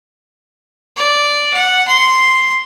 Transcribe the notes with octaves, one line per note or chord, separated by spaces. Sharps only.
D5
F#5
C6